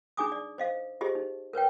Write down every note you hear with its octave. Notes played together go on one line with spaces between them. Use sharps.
D4 D#4 G#4 G#5 D6 D#6
D5
C5 D#5 F5
F4 G4 G#4 C5 D#5
D#4
A#4 B4 C#5 G5